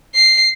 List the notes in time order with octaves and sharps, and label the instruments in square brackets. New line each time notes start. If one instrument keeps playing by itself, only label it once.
[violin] C7